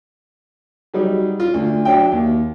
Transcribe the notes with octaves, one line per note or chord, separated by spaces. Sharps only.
F#3 G3 D#4 G#4
F4
D2
F#3 D4 E5 G5
D#2